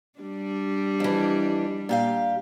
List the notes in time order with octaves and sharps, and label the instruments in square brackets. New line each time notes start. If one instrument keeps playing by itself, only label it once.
[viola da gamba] G3 D4
[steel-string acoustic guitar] F2 E3
A#2 G4 F5